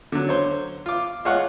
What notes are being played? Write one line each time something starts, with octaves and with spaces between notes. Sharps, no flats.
D3 F#3
C5 C#5
F4 D6
G#3 F4 C#5 F#5 C#6 F#6